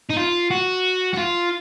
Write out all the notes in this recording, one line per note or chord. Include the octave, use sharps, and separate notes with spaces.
D#4
F4
F#4
F#4
F4